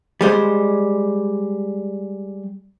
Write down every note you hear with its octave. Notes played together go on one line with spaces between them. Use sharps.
G3 G#3 C5